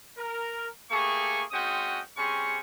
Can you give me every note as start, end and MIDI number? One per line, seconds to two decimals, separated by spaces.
0.16 0.68 70
0.90 1.43 57
0.90 1.43 58
0.90 1.43 67
0.90 1.43 68
0.90 1.43 85
1.52 2.00 56
1.52 2.00 60
1.52 2.00 61
1.52 2.00 66
1.52 2.00 79
1.52 2.00 87
2.16 2.60 55
2.16 2.60 60
2.16 2.60 61
2.16 2.60 68
2.16 2.60 85